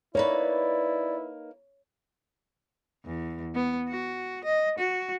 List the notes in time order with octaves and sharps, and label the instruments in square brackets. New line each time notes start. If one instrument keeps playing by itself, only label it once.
[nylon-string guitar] A#3 D#4 B4 [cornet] E4 [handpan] C#5 [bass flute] D5
[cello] E2
B3
F#4
D#5
F#4